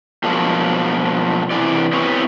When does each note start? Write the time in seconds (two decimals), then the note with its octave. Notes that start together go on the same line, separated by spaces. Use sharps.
0.24 B2 F3 F#3 G#3 A#3 D4
1.51 C3 E3 D5
1.93 B3 C4 E4 G4 B4 C#5